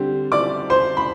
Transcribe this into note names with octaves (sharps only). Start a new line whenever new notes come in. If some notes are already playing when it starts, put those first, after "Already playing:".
Already playing: D3 G3 C4
D5 D6
C5 C6
B5